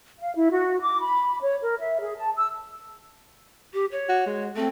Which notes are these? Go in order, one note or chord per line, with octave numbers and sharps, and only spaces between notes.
F5
E4
F#4
D6
B5
C#5
A#4
E5
G#4
A5
E6
G4
C#5
F#4
G#3
A3 C4